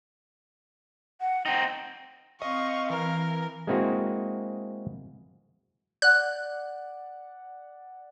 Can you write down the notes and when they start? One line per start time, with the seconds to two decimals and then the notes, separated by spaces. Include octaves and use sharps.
1.21 F#5
1.46 C4 D#4 G5
2.42 C4 D#5 F5 C#6
2.90 E3 A#4
3.67 G#3 A#3 C4 E4 F#4 G#4
6.02 D5 F#5 F#6